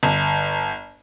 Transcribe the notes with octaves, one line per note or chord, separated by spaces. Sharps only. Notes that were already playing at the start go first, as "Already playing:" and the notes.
G1